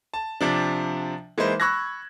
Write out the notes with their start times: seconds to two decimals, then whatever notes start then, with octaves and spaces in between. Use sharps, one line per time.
0.14 A5
0.41 C3 F3 D4
1.38 E3 G#3 A#3 D#4 B4 C5
1.60 B5 C#6 E6 F#6 G#6 A#6